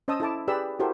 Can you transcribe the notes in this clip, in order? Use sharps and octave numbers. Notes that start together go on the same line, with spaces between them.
C#4 C5 D#5 A5 D#6 E6
E4 A4 A5 D6
G4 G#4 B4 D5 B5 E6
E4 F#4 G4 A4 A#4 C5